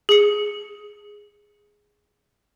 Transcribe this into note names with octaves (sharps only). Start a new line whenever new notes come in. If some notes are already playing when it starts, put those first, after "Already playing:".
G#4 C#7